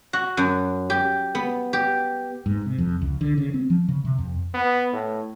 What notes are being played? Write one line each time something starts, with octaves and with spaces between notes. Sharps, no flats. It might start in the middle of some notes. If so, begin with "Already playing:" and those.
F#4
F#2
G4
B3
G4
G#2
C3
F2
C#2
D3
C#3
C4
F3
C#3
C3
F2
B3
A2